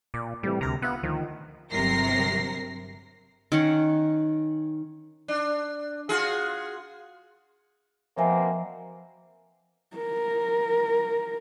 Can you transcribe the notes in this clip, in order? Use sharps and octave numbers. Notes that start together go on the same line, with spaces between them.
A#2 D5
A2 C3 E3 G3
D2 C3 A#4 A#5
B3 F4 E5 F#5
D2 D#3 F3
G1 C3 F#3 A#4 A#6 C7
D#3 C#4 F#5
D4
F4 F#4 G#4
B2 F3 A#3 C4 E5 G#5
A#4